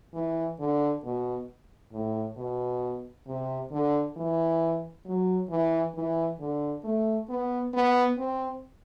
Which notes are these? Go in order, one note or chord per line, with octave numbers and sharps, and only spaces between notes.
E3
D3
B2
A2
B2
C3
D3
E3
F#3
E3
E3
D3
A3
B3
B3
C4